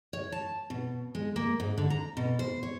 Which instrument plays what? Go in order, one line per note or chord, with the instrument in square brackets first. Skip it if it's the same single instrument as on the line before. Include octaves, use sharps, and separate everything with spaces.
[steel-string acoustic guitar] C#5
A5
B2
G#3
A#3
G#2
D3
A#5
B2
C5
C#5